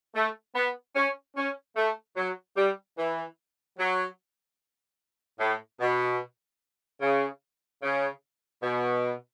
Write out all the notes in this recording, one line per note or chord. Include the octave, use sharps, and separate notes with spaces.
A3
B3
C#4
C#4
A3
F#3
G3
E3
F#3
A2
B2
C#3
C#3
B2